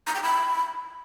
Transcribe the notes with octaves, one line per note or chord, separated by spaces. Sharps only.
A#5
G5
B5